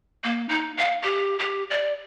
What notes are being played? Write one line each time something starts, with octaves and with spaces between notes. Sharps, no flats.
A#3
D#4
F5
G4
G4
D5